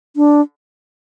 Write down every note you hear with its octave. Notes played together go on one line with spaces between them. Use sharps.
D4